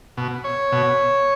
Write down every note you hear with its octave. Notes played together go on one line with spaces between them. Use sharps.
B2
C#5
B2